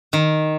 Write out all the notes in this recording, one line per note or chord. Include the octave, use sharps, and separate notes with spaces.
D#3